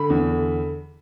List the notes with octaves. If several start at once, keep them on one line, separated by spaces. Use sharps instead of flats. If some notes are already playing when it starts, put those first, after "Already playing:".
Already playing: D3 B5
E2
D3